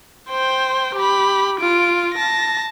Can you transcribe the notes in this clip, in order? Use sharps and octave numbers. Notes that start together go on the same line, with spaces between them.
C5 G5
G4 B5
F4 D7
A5 A#6